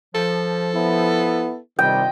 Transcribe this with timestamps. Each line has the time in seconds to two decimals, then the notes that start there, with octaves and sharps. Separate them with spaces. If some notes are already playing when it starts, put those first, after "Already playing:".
0.15 F3 A4
0.74 B3 E4
1.79 G2 C3 D#3 G3 F4 D#5 G5